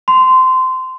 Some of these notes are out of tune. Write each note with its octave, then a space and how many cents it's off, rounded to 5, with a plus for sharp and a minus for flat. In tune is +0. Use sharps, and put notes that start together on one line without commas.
C6 -20